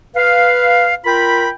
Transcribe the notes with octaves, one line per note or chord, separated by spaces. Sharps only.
B4 F5
F4 A#4 G5 B5